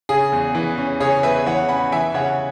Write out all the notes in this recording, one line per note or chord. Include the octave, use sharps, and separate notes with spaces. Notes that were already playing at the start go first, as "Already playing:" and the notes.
C#3 G#4
E2
E3
C#4
C#3 G#4 C#5
E2 B4 E5
E3 C#5 F#5
C#4 F#5 B5
E3 E5 G#5
C#3 C#5 F#5